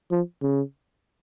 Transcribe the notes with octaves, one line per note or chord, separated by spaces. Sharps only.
F3
C#3